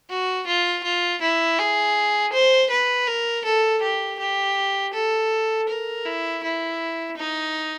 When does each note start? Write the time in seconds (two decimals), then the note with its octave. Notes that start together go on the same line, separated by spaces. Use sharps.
0.10 F#4
0.47 F4
0.84 F4
1.22 E4
1.59 G#4
2.33 C5
2.70 B4
3.07 A#4
3.45 A4
3.82 G4
4.19 G4
4.93 A4
5.68 A#4
6.05 E4
6.43 E4
7.17 D#4